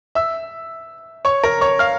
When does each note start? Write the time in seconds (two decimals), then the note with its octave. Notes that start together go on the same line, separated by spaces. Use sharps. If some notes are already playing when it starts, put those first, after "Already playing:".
0.15 E5 E6
1.25 C#5 C#6
1.43 A#4 A#5
1.61 C#5 C#6
1.79 F5 F6